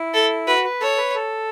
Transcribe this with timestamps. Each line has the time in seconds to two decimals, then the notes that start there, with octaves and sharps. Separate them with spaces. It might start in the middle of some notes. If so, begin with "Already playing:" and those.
Already playing: E4
0.14 A4
0.47 F#4 B4
0.64 B4
0.81 A4 C#5
0.98 B4
1.15 A4